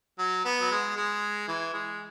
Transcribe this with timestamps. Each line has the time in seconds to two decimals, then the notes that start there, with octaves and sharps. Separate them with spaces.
0.19 F#3
0.45 B3
0.61 F#3
0.71 G#3
0.96 G#3
1.48 E3
1.74 G#3